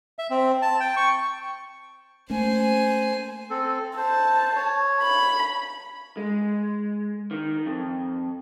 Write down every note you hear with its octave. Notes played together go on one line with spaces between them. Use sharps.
E5
C4
A5
G5
C#6
A3 A#3 C#4 C5 G#5
C4 A4
C5 A5
C#5
B5
G#3
D#3
F2